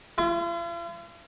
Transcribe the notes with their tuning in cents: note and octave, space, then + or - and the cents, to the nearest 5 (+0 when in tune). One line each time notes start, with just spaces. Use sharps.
F4 -45